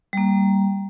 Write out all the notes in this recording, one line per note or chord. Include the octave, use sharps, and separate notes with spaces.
G3 A#3